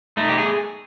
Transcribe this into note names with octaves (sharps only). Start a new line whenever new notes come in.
A3 D#4
G4
G#4